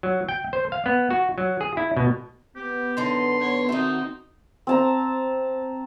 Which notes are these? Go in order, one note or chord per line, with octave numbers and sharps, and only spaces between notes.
F#3
G5
C5
F5
B3
F#4
F#3
G#4
E4
B2
B3 G4
F#2 D3 D#4 C6
C#5
D#3 C4 D#4 F#4 E5
C4 A5 A#5